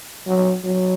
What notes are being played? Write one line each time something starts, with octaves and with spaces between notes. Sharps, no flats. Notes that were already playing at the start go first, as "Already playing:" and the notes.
F#3
F#3